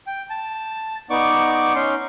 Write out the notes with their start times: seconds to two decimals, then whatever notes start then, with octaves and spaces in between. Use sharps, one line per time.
0.07 G5
0.30 A5
1.10 B3 D#4 D5 C#6 D6
1.75 C#4 D#4 C6